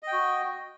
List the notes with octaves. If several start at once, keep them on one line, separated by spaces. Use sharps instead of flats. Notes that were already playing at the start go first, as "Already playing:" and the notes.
F#4 D#5 G5